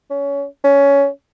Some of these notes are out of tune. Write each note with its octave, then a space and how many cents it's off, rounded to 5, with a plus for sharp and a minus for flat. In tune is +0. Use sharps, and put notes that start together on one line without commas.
C#4 +20
C#4 +15